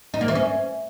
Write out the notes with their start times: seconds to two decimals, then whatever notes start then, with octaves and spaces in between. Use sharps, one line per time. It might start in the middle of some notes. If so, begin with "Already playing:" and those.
0.14 D#4
0.21 A#3
0.28 E3
0.35 C#4